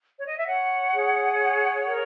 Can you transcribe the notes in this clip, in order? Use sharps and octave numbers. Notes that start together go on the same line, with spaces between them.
C#5
D#5
E5
C#5 F#5
G#4
C#5
A#4